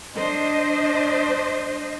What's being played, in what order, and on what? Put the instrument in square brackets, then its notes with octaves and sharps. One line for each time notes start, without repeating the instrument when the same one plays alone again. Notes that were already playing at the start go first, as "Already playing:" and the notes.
[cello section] D4 C5 D#5